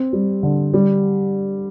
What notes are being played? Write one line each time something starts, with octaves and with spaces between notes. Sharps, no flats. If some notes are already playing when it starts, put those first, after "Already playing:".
Already playing: C4
G3
D3
G3